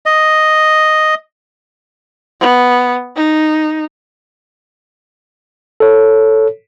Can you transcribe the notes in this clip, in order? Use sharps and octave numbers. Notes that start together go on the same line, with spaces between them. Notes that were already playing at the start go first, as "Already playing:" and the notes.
D#5
B3
D#4
A4 C#5